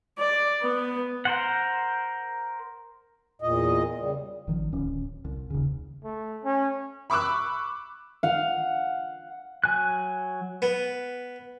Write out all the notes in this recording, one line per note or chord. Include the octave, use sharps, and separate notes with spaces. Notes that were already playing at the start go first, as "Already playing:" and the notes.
D5
B3
A#4 C5 F#5
E2 A#2 D#5
C#3 G3
G#1 D#3 F3
D1 C#4
C2
D#1 C#3
A3
C#4
B5 C#6 D6 E6 F#6
F5 F#5
F#3 G#5 F#6
B3